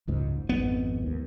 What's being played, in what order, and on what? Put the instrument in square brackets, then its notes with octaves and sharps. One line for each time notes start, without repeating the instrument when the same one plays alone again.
[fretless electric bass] F#1 C#2 G#2
[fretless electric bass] G#1 F2 G#2 [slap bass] B3
[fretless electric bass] D#2